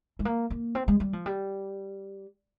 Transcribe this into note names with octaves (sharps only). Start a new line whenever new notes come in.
G#3
A#3
A#3
C4
G#3
G3
F3
G3